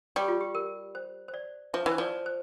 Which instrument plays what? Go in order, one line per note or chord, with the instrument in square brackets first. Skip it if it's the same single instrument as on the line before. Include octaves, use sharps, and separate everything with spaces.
[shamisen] G3 [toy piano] G4
[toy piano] F4
G4
A#4
C5
C5
D5
[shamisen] F3 [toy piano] E5
[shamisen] E3
[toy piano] C5
[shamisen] F3 [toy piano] D5
[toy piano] C5